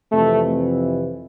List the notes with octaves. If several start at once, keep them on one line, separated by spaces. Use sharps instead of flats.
F2 C3 E3 A3